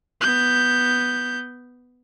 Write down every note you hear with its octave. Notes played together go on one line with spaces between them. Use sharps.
B3 G6